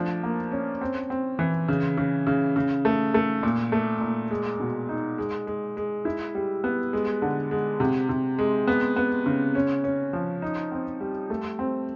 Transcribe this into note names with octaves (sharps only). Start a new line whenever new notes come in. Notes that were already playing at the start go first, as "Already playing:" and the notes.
Already playing: F3 A3 D4
A#3
C#4
C4
C4
E3
C#3
C#3
C#3
C#3
A3
A3
A#2
A3
A#2
G#3
B2
D#4
G#3
G#3
G#3
E4
G3
B3
G#3
D3
G#3
C3
C3
G#3
B3
B3
C#3
C#4
C#4
F3
D#4
C4
G3
A3
C4